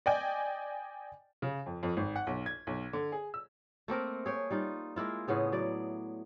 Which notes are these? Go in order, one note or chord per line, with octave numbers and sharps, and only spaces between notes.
D5 D#5 G5 G#5
C#3
F2
F2
G#1
F#5
B1
G#6
B1
D3
G#4
E6
A3 A#3 C4 A#4
G#4 C#5 G5
G3 D#4 F4
G#3 A#3 E4 F4
A2 C#3 B3 G#4
F#3 D5